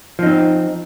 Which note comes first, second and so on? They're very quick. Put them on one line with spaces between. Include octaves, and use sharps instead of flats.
F3 D#4 C4